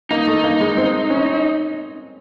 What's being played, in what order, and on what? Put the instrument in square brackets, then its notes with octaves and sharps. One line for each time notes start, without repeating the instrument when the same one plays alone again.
[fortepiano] A#3 [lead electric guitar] D#4
[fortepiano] A3
A#3
G#3
C4
C#4